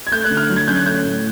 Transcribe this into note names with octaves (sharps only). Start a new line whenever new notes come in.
G#6
A3 G6
F#6
D3
F6
F#3
G#6
C#4 G6
F#6
A3 G6
A2